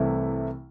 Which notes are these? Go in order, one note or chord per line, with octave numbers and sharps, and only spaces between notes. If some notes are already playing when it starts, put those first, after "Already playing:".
Already playing: C2 C3 E3 A3 E4